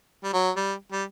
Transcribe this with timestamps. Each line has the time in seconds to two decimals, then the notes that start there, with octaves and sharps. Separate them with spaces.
0.24 G3
0.33 F#3
0.56 G3
0.92 G3